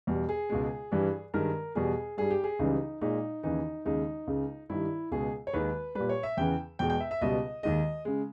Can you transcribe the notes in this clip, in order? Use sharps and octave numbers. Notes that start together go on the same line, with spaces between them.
E2 B2 G3
G#4
C#2 B2 G#3
G2 E3 G3
G2 D#3 G#3 A#4
E2 B2 G3 G#4
G2 G3 G#4
G4
G#4
C#2 C#3 E3 G3 D#4
A#2 G#3 D#4
D#2 C#3 E3 D#4
D#2 C#3 G#3 D#4
C#2 C#3 G#3
G2 D#3 G3 E4
C#2 B2 G#3 G#4
C#5
D#2 D#3 G#3 B4
A#2 G3 B4
C#5
E5
E2 C#3 E3 G5
E2 B2 G#3 G5
G5
E5
E5
C#2 B2 G3 D#5
D#2 D#3 G#3 D#5
C#3 G#3